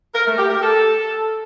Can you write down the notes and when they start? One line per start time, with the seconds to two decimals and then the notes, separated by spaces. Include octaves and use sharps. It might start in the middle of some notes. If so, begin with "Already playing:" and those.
0.15 A#4
0.27 A3
0.38 G4
0.50 A#4
0.62 A4